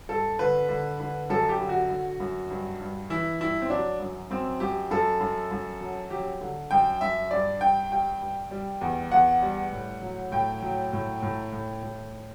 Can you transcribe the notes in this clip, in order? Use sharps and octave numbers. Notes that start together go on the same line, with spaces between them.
G2 A4
D3 B4
D3
D3
F#2 A4
G4
D3
F#4
D3
F#2
G2
G2
E3 E4
G2 E4
C4
F#3 D4
F#2
F#2 C4
F#2 G4
F#2 A4
F#2
F#2
F#3
F#3 G4
D3
F#2 G5
F#2 E5
G2 D5
G2 G5
G3 G5
G2
G3
E2
E2 F#5
G3
A2
F#3
A2 G5
F#3
A2
A2
A2
A2